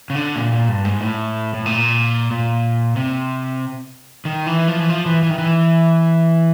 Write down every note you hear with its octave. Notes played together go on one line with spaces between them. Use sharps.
C#3
D3
A#2
A#2
G2
G#2
A2
A2
A#2
A#2
C3
D#3
E3
F3
E3
F3
E3
E3
D#3
E3